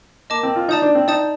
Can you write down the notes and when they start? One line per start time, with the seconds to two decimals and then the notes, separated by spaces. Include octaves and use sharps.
0.30 A#3 D#5 A5 D6
0.43 C4
0.56 F4
0.68 D#4 D5 A5 D#6 G6
0.82 D4
0.95 C4
1.07 D#4 D5 A5 D#6 G6